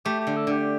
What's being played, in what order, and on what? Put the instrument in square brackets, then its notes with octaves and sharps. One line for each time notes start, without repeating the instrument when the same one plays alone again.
[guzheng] A3 [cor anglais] G4
[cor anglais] G4
[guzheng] D3
[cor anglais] A4
[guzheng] D3 [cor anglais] G4